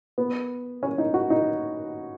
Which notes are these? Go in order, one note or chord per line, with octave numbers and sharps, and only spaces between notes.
B3
C#4
D#4
F#4
D#4